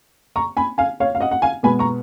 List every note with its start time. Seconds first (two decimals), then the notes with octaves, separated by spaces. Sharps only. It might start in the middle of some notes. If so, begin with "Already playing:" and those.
0.36 A#5 C#6
0.57 G#5 B5
0.78 F5 G#5
1.00 C#5 F5
1.15 F5
1.20 D#5 F#5
1.31 F#5
1.42 F5 G#5
1.63 B2 G#3 B3 G#5 B5
1.79 A#5 C#6